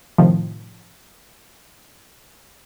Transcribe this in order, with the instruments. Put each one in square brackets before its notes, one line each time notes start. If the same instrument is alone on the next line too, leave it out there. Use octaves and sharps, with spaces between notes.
[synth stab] A2 C3 D#3 F3